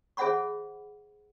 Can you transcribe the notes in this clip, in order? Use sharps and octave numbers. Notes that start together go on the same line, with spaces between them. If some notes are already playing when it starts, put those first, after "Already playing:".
G#4 C5 E5 F#5 B5 C#6